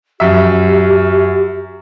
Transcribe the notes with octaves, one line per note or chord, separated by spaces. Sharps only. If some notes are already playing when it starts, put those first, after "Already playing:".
F#2 G4 E5